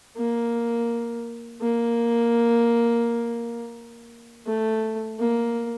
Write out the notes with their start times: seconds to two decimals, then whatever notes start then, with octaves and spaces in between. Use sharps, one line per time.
0.17 A#3
1.61 A#3
4.46 A3
5.19 A#3